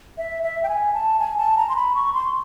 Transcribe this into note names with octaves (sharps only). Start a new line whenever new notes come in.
E5
E5
G5
G#5
A5
G#5
A5
A#5
C6
B5
C#6
C6